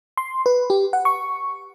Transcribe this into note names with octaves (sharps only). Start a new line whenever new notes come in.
C6
B4
G4
F#5
C#6